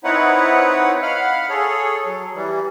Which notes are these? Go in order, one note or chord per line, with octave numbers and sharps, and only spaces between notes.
C4 D#4 E4 B4 C#5 F#5
F5 F#5 B5 F6
G#4 A4 C#5
F#3
E3 G3